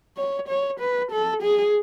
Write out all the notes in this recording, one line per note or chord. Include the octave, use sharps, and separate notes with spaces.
C#5
C#5
B4
A4
G#4